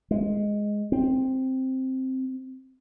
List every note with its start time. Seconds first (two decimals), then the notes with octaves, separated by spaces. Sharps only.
0.11 G#3
0.92 C4